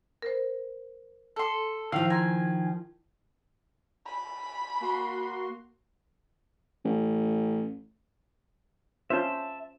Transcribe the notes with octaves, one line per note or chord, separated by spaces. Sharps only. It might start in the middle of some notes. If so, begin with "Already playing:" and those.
A#4 C5
A4 C6
D#3 F3 E4 E5 F5
G#5 A#5 C6 A#6
B5
A#3 F#4 C6
A1
C#4 F4 C5 E5 A5